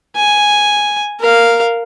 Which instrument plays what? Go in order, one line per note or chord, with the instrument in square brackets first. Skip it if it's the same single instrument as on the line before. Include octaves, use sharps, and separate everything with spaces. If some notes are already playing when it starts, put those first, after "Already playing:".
[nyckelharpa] G#5
A#4 F5